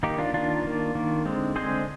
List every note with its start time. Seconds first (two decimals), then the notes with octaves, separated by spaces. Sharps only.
0.03 D#3 A#3 D#4 G4
0.18 D4 F4
0.33 D#3 A#3 D4 F4
0.64 D#3 A#3
0.95 D#3 A#3
1.25 D3 G#3 C4
1.56 D3 G#3 C4 G#4 C5